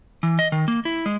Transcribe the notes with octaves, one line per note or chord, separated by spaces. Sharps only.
E3
D#5
D#3
A#3
E4
G#3